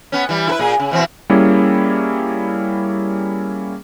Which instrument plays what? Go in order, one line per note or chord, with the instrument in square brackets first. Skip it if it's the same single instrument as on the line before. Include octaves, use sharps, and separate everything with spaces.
[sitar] B3 C#4
E3 G3
E4 A4 B4
A#2 G#4
C#3
B2 E3 C4
[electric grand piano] G3 A#3 C#4 E4 G#4